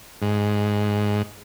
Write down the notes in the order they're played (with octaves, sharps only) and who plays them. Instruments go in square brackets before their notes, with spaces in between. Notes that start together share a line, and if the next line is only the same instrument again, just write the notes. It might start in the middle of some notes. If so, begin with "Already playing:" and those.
[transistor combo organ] G#2